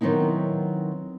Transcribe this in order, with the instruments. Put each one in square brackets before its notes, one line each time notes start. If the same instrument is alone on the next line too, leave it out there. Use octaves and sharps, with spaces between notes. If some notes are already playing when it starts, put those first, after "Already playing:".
[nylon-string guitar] D#3 F#3 B3 C4 D#4 E4